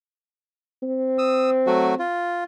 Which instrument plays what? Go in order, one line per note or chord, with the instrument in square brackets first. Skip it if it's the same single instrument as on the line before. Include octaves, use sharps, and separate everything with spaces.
[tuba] C4
[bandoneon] D#6 E6
F#3 A3 F#4
F4